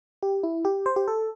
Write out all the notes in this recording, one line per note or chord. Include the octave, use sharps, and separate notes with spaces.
G4
E4
G4
C5
G4
A4